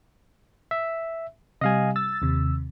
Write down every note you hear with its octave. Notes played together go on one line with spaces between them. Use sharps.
E5
C3 G3 D#5 F5 G#5
E6 A6
D#2 C3